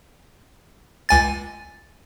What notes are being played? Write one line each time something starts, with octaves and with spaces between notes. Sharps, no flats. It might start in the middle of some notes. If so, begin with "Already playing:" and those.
C#2 G#5 A6